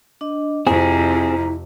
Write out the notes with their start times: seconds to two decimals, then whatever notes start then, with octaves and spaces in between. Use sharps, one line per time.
0.21 D4 D#5
0.67 F2 C3 C4 E4 G#4 A#5